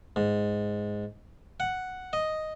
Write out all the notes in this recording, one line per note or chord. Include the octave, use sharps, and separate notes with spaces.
G#2
F#5
D#5